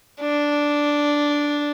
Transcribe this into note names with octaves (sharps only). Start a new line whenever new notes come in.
D4